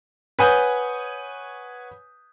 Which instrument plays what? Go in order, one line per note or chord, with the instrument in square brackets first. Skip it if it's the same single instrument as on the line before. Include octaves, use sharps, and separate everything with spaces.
[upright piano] B4 C#5 F#5 G#5 D#6 G6